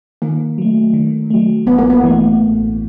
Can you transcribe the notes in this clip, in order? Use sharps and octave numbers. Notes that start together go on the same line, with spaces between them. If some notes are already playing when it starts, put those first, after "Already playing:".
D#3 A#3
F#3 A3
D#3
F#3 A3
A1 B3
A#3
B3
G2 E3 A3
A1